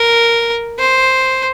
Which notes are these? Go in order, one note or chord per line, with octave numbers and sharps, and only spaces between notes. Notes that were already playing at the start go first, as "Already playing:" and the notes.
Already playing: A#4
C5